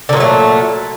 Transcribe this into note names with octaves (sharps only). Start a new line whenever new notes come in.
A#2 D3 F#3 A3